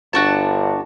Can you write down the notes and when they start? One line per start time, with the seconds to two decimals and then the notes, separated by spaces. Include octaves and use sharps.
0.13 G1 D4 F#4 A5